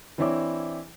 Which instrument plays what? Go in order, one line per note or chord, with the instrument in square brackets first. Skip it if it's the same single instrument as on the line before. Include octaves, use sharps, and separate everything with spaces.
[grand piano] E3 C4 D4 E4 C#5 D6